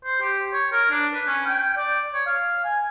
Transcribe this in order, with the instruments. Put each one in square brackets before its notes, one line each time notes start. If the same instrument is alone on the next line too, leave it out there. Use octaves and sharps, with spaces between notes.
[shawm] C5
G4
C#5
A#4
D4
B4
C#4
G5
D5
C#5
F5
G#5